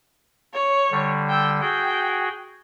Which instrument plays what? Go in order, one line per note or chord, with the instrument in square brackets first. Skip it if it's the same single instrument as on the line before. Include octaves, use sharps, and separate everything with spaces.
[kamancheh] C#5
[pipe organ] D3 G3
[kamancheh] G5 E6
[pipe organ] F#4 G#4 [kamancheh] G5